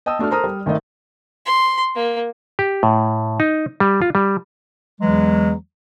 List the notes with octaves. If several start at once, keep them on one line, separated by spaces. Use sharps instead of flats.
D#5 G5 A5 D#6 E6
A3 D4 F#4 A4 F6
A4 A#4 C5 A#5 D#6 F6
G3
G#1 D#3 A3 D#4 D#5 E5
C6
A#3
G4
A2
D#4
G3
F4
G3
E2 E3 F#3 G#3